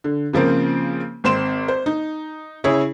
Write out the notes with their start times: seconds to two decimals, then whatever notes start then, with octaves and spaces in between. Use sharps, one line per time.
0.04 D3
0.33 C#3 F3 A#3 C4
1.24 G#1 C4 C6 E7
1.68 C5
1.86 D#4
2.64 C#3 E4 G#4 C#5